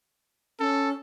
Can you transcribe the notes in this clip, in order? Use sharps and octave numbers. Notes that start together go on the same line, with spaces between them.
C#4 A4